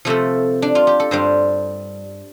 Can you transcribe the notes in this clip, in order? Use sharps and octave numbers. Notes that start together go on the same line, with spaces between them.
C3 F3 A3 A4
D4
F4
G4
A4
G2 G3 C5